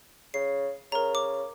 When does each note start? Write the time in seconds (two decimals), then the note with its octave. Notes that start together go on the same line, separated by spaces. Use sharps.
0.34 C#3 C7
0.92 C#3 A#4 A#5
1.15 D6